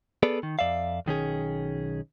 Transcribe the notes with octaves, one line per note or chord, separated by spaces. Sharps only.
B3 G#4 A4 B4 D5
D#3
F2 D5 E5 F5
B1 D#3 C#4 G#4